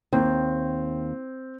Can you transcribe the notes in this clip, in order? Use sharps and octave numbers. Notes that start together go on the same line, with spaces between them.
D#2 C4